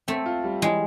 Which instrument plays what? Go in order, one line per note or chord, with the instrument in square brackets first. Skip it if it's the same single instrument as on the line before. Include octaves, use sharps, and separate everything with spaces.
[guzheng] A3 [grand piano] C4
[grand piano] F4
G3
[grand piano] E3 [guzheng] G#3